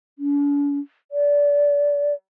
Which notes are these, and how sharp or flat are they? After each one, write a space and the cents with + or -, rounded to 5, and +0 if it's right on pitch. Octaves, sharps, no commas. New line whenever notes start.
D4 -45
D5 -25